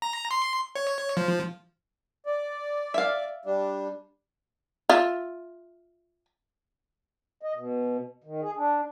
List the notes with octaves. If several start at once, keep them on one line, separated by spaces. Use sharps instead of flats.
A#5
C6
C#5
F3
D5
E5 F5
G3 D4
F4 E5
D#5
B2
D#3
G#4
D4